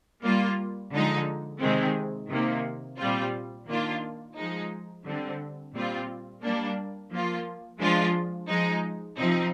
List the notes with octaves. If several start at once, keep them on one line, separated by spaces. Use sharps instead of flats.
G3 A#3 F4
D3 F3 G#3 D#4
C3 D#3 G#3 C4
C3 D#3 A#3
A#2 G3 C4 F4
D#3 A#3 D4 F4
F3 G#3 D#4
D3 G3 C4
A#2 G3 C4 F4
G3 A#3 D4
F3 A#3 F4
F3 G#3 D4 F4
F3 G#3 D#4
C3 F3 C4 D#4